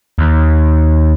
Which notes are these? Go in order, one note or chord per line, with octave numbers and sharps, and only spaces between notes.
D#2